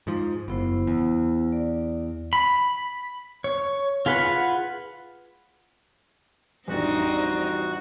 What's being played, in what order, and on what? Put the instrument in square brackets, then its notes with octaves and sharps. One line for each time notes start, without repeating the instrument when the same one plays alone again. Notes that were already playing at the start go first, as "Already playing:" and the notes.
[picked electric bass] G#2 F3
[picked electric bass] F#1 [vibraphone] B3 E4 C5
[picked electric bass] E2
[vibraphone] D5
[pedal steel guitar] B5
C#5
F4 G#4 B4 F#5
[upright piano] A1 F2 [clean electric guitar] G3 D4 [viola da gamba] C4 D#4 [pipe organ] F#4